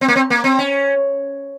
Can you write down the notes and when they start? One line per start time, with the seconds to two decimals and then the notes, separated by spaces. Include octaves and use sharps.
0.01 C4
0.08 A#3
0.16 C4
0.30 A#3
0.44 C4
0.59 C#4